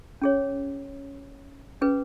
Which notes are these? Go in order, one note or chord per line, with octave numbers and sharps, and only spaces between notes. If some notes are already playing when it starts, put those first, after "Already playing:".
C#4 G#4 C#5
C#4 G#4 B4